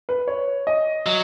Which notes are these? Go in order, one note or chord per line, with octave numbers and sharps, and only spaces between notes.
B4
C#5
D#5
F#3 D#5